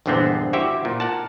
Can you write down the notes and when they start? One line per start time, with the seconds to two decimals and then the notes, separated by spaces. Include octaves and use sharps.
0.06 A#1 E2 G2 D3 B3 C4
0.53 E4 F#4 G4 C5 E5
0.85 A#2
1.00 A#4 F#5 A5